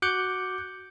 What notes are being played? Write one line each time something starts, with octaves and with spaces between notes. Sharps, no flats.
F#4 D6 F#6 G6 C#7